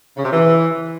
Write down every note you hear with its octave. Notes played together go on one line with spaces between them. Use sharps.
C#3
C3
E3